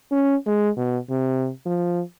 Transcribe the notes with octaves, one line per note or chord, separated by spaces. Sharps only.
C#4
G#3
B2
C3
F3